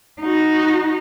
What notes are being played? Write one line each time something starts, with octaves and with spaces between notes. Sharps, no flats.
D#4 F#4